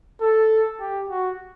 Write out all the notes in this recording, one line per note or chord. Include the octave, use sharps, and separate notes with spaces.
A4
G4
F#4